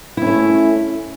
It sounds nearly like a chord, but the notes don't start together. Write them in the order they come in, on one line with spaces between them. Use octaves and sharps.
E4 C#4 A3